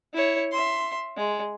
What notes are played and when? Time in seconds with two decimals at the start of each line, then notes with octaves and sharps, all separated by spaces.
0.13 E4 C#5
0.52 E5 C6
1.17 G#3